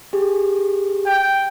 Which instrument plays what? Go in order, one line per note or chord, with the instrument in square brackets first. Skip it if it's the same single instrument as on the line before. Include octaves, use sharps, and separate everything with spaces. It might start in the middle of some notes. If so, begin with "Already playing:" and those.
[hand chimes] G4 G#4
[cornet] G5